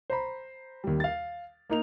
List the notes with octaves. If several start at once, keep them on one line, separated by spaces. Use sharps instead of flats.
C5 A#5 B5
D#2 G3
F5 A6
A#3 D#4 F7